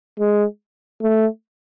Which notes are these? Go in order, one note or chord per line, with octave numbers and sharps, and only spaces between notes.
G#3
A3